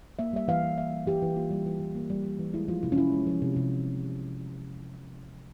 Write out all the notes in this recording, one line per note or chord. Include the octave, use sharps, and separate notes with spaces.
A#3 E5
G3 E5
E3 F5
E3
A#3 E5
G3
E3 G4
E3
A#3 F4
G3
E3
E3
A#3
G3
E3
E3
G#3 E4
F3 F4
C3 E4
C#4
C3 E4
G#3
F3
C3
C3